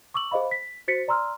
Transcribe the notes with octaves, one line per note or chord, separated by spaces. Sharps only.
C#6 D6 E6 F#7
G#4 C5 D#5 F5 B5
B6
F#4 C5 A6 B6 C#7
D5 A#5 C6 E6 F6